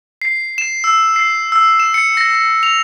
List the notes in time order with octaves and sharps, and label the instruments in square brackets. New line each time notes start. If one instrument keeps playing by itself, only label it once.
[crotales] C7
E7
E6
C7
E6
E7
C#7
A#6
C#7
F7